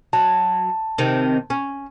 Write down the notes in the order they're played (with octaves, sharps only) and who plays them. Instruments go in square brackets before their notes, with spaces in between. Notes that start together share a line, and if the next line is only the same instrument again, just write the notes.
[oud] F#3 [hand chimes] A5
[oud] C3 D#3
C#4